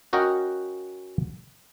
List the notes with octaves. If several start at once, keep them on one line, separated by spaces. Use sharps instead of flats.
C#4 F#4 A#4 D#5 F#5 G5